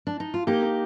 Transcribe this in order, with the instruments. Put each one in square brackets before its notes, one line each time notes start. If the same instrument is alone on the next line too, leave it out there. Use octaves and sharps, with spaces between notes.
[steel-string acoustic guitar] D4
D#4
F4
[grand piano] A#3 [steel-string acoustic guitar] D#4 G4
[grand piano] A#3